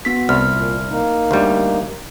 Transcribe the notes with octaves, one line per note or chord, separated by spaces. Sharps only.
B3 F#4 B6
C2 F6
A#2
A#3 D#4
D2 G3